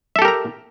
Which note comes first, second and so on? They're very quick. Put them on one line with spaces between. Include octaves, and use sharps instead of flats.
E5 A4 G4 A#4 A#5